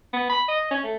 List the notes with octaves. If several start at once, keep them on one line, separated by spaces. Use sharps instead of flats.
B3
B5
D#5
C#4
A3